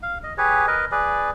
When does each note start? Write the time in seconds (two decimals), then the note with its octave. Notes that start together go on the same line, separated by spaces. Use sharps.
0.03 F5
0.24 D#5
0.38 G4 G#4 B4 C#5
0.67 A#4 B4 D#5
0.92 G#4 B4 D5